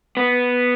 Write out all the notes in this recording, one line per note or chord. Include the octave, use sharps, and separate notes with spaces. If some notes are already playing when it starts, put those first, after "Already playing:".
B3